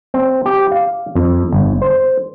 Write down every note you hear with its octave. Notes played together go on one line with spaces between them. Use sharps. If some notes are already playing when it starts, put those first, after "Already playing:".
C4
G4
F5
F2
G1
C5